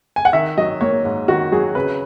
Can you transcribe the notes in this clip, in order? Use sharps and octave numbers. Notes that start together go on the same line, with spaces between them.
G#5
F#5
D#3 E5
F#3 D#5
A#3 C#5
G#2
D#3 F#4
F#3 G#4
C#3 B4